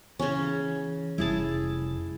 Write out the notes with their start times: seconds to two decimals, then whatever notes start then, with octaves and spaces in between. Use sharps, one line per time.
0.19 C#3 E3 C#4
1.18 F1 G3 E4 G#4 A5